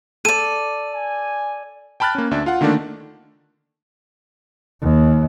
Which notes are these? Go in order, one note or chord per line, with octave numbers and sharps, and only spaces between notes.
A4 D5 D#7
G#5
G5 A5 B5 F6 F#6 A6
A#3 C#4
D2 D4 E5
F4 F5 F#5
D3 D#3 A3 A#3 D4
D#2